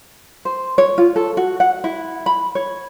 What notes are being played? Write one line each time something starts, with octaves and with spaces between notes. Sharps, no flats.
C5
C#5
F4
A4
F#4
F#5
E4
B5
C#5